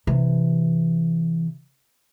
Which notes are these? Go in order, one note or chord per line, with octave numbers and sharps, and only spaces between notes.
C3 E3